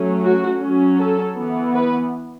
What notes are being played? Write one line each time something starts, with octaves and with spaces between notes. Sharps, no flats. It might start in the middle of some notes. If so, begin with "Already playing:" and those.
Already playing: F#3 A3 C#4
F#4
F#3 C#4
A4
E3 B3
B4